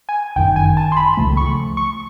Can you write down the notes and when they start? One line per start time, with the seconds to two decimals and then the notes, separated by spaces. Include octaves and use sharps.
0.09 G#5
0.36 G1 F#2 D#3 G5
0.56 G#5
0.77 A5
0.92 C6
0.97 B5
1.17 C#2 C#3 F3 A3
1.37 C#6
1.77 C#6